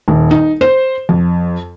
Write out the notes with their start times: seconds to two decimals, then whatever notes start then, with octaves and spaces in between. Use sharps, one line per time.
0.08 D#1
0.31 D#4
0.61 C5
1.09 F2